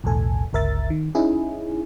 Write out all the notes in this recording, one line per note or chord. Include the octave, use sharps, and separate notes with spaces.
B1 E2 A2 A4 G#5
G1 C#2 A#4 E5 A6
D#3
C#4 D#4 E4 G#4